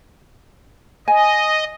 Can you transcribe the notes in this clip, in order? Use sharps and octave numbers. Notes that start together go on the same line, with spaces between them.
D#5 G#5